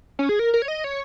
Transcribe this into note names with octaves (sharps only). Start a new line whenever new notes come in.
C#4
G#4
A#4
A#4
C#5
D#5
C#5